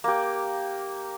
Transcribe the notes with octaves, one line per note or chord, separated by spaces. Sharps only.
A#3 G4